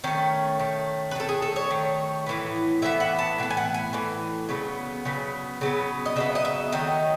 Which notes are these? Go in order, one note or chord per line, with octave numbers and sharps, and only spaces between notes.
D#3 A3 C#4
D#3 A3
B4
D#3 A3 A4
G#4
A4
C#5
D#3 A3
A2 E3 B3
A2 E3 B3 E5
F#5
A5
A2 E3 B3
G#5
F#5
G#5
A2 E3
C#3 F#3 B3
C#3 F#3 B3
C#3 F#3 B3
D#5
C#3 F#3 B3 E5
D#5
E5
D#3 F#3 A3 D#5